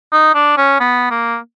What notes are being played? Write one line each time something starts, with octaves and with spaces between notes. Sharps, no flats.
D#4
D4
C#4
B3
A#3